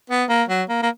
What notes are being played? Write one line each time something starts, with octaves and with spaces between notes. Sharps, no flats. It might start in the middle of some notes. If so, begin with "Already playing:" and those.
B3
A#3
F#3
A#3
A#3